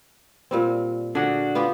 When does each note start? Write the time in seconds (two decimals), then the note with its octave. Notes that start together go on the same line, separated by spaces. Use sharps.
0.51 A#2 G3 C4
1.15 D3 D4 F#4 G#4
1.55 B3 F4 G4